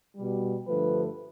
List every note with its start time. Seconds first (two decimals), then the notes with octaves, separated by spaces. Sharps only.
0.16 B2 G3
0.67 G2 D3 F3 A3 B4